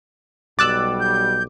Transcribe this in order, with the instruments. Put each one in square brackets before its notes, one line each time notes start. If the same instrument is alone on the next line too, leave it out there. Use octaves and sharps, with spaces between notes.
[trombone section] B1 B2 G3 [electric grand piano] D6 [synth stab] E6 F#6 A6
[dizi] G6